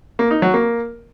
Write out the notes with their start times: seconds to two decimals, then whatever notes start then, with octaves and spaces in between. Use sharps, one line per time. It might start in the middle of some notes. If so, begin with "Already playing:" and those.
0.19 A#3
0.31 D#4
0.42 F#3
0.54 A#3